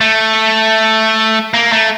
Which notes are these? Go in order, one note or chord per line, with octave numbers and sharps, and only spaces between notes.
A3
A#3
A3